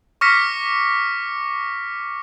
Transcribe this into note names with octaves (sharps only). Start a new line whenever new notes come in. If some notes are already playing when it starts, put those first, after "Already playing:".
C#6 D6 F6 A#6 B6 C#7